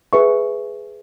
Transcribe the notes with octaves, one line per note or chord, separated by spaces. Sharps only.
G#4 B4 E5 C#6